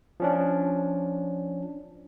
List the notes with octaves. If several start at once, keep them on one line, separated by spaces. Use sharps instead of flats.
F3 C#4 D4